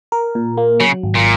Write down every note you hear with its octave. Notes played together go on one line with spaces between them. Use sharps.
A#4
A#2
A#3
C#3 F#3
G#1
A#2